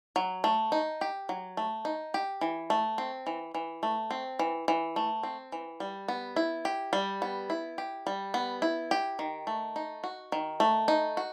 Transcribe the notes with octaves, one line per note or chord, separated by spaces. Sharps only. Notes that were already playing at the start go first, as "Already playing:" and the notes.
F#3
A3
D#4
G4
F#3
A3
D#4
G4
E3
A3
C4
E3
E3
A3
C4
E3
E3
A3
C4
E3
G3
B3
E4
G4
G3
B3
E4
G4
G3
B3
E4
G4
D#3
A3
D#4
F#4
D#3
A3
D#4
F#4